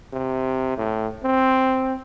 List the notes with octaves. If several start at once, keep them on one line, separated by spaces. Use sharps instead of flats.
C3
A2
C4